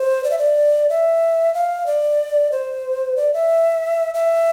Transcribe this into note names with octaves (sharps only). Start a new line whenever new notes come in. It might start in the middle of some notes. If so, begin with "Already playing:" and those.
Already playing: C5
D5
E5
D5
E5
F5
D5
C5
D5
E5
E5